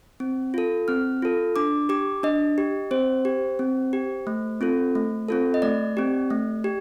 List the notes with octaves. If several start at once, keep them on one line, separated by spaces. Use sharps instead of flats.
C4
F4 A4
C4 F6
F4 A4
D4 D6
G4 D6
D4 D#5
G4
C4 C5
G4
C4
G4
A3
C4 F4 A4
A3
C4 F4 A4
D#5
A3 D5
C4 G4
A3
G4